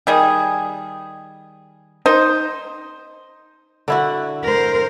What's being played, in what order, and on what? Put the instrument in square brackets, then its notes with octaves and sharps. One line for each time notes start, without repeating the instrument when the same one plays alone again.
[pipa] D#3 G3 G#4
D#4 C5
[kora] D3 E4 F#4
[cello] A#4 C5